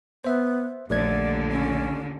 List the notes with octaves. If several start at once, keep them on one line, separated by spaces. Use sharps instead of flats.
B3 C5 E5
A#1 D#2 A#2 D3 A3 D5 G#6
C#4